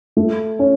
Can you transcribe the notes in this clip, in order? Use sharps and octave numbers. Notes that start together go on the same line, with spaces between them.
A3
C#4